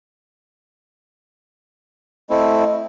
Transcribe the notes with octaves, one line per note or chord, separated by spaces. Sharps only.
A3 C4 E4 D#5